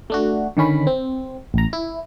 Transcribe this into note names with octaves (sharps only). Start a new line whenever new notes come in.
A3 D4 F#4
D3 D#3 C#4 B5
C4
A1 A#5
E4